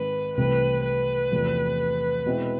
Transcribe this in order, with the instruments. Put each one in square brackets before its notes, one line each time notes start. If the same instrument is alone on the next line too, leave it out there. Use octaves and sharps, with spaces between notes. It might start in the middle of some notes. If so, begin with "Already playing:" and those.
Already playing: [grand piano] G#2 D#3 G#3 C4 [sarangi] B4
[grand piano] C2 C3 E3 A3 C4 [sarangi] B4
[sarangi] B4
[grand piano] E2 C3 F3 A3
B2 G#3 C4 E4